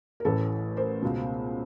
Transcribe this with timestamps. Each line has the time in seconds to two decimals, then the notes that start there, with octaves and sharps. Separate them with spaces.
0.20 A#4
0.25 A1 A2 E3 A4 B4
0.76 A#4 C5
1.02 C#2 B2